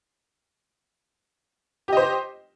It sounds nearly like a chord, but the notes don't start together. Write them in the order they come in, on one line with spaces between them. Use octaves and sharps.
G4 D#5 C5